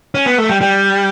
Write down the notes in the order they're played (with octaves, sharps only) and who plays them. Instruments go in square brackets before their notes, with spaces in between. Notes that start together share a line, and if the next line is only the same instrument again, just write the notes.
[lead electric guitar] C#4
B3
A3
G3
G3